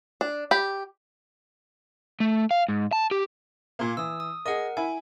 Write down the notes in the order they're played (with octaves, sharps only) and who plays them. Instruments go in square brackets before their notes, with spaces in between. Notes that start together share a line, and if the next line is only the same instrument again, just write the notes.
[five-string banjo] D4
G4 B5
[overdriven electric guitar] A3
F5
G#2
A5
G4
[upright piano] A#2 A#3
[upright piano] E3 [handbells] D#6 E6
[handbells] D#6
[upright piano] G#4 D#5 [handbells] A#4 F#5
[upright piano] E4 [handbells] G#5